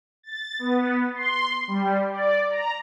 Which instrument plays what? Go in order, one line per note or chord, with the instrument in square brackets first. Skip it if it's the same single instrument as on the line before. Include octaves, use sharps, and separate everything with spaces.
[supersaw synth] A6
B3
C6
G3
D5
A#5